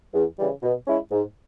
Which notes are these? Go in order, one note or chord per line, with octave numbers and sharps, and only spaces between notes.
E2
C#3 E3 G3
B2
G#3 C#4 E4
G#2